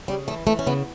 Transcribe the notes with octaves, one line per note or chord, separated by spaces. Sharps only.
C#3 G3
E3 A3
E3 A3
C#4
C#3 B3